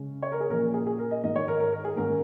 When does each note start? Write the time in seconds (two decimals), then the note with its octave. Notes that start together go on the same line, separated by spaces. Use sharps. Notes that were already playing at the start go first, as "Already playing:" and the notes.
Already playing: C#3 G#3 C#4
0.23 C#5
0.32 A#4
0.40 G#4
0.50 A#2 F3 C#4 A#4
0.74 G#4
0.86 G#4
0.98 A#4
1.11 D#5
1.24 G#2 D#3 G#3 D#5
1.36 C#5
1.48 A#4
1.60 A#4
1.73 A#4
1.84 G#4
1.96 G#2 D#3 C#4 A#4